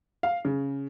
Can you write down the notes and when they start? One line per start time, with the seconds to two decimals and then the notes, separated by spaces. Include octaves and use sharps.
0.23 F5
0.45 C#3